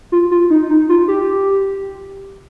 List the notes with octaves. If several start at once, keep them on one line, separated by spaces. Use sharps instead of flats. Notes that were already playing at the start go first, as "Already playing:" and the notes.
F4
F4
D#4
D#4
F4
G4